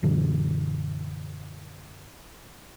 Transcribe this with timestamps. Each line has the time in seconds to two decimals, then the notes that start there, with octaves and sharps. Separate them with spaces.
0.03 F#2 A#2 D3 E3